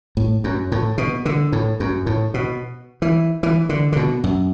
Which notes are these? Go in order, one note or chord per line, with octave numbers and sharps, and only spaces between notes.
A2
F#2
A2
B2
D3
A2
F#2
A2
B2
E3
E3
D3
D3
B2
F#2